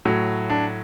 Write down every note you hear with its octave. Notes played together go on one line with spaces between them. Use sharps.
A2 F#3
D4